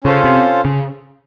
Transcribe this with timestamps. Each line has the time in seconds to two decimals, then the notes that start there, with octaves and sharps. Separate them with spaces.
0.04 C#3 C#4 F4 A4 C5 F5
0.24 C3
0.65 C#3